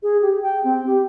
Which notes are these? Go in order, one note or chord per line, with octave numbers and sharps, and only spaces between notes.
G#4
G4
G5
C4
G4